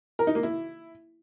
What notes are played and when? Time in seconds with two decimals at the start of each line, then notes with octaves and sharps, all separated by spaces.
0.19 A#4
0.27 D#4
0.35 A#3
0.43 E4